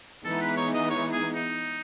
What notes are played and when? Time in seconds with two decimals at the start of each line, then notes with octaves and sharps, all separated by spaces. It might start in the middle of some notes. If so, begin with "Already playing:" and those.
0.25 E3 G#3 B3 D#4 A4
0.41 B4
0.57 C#5
0.74 D#5
0.90 C#5
1.13 G#4
1.35 D#4